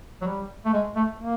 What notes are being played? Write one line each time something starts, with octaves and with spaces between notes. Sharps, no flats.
F#3
G3
A3
G#3
A3
A#3